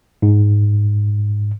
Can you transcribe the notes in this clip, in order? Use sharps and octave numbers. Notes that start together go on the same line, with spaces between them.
G#2